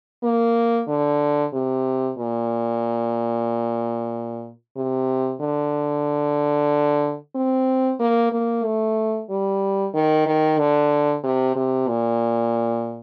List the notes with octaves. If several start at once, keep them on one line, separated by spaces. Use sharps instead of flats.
A#3
D3
C3
A#2
C3
D3
C4
A#3
A#3
A3
G3
D#3
D#3
D3
C3
C3
A#2